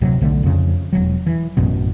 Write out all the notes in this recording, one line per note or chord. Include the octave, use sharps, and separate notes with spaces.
D1 C3 F#3
B1 D3 A3
F2 C#3
E1 F#3
E3
A1 F#2 B2